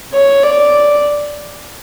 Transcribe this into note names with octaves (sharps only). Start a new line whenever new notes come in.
C#5
D5